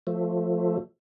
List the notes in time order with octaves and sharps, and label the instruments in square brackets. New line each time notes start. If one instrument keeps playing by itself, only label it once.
[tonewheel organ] F3 A3